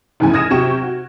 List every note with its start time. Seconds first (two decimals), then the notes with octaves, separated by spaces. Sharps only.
0.20 F1 E2 A2 C#3 G#5
0.33 D#6 F6 G#6 A#6 D#7 E7
0.51 C3 F#3 G5 C#6 E7
0.83 F#4